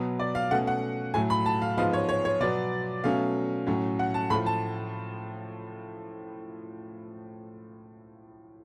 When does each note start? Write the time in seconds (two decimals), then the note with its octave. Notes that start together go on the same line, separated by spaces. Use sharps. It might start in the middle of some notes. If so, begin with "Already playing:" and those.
Already playing: B2 F#3 B3
0.19 D5
0.35 F5
0.51 B2 A3 C#4 F#5
0.67 F#5
1.14 A2 F#3 A3 G#5
1.30 B5
1.46 A5
1.62 F5
1.77 G#2 F3 G#3 B3 F5
1.93 C#5
2.09 C#5
2.25 C#5
2.40 B2 F#3 B3 D5
3.04 B2 F#3 A3 C#4 F5
3.67 A2 F#3 C#4
3.99 F#5
4.14 A5
4.30 A2 F3 A3 B5
4.46 A5